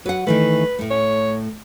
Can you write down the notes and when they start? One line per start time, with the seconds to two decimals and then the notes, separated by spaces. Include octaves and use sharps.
0.06 F#3 B4 F#5
0.27 D#3 E3 A3 B4
0.79 A2 A3
0.90 C#5